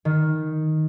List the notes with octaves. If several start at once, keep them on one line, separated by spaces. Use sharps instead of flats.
D#3